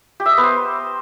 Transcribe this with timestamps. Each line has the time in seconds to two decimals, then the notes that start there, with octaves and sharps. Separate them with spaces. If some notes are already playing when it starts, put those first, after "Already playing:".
0.20 G4
0.26 E5
0.32 D#5
0.37 B3
0.43 C5